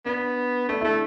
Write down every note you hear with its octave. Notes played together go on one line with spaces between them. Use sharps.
B3 D4
A3 D4
A3 E4